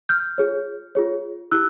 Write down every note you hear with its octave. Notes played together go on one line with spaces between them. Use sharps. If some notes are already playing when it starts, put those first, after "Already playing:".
F6 G6
F4 G#4 C#5
F4 G#4 C#5
E4 G4 E6 F#6